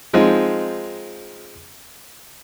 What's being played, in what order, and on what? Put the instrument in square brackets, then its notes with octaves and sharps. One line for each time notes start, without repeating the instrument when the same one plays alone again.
[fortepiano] F3 G#3 C4 D#4 F4